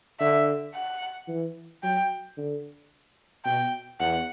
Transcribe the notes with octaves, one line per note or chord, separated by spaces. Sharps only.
D3 E5
F#5
E3
F#3 G5
D3
B2 G5
E2 F#5